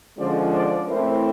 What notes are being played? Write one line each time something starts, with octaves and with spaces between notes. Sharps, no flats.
D3 F3 G#3 C#4 C5 D5
C5 D5
A2 E3 A3 C4 A#4 C5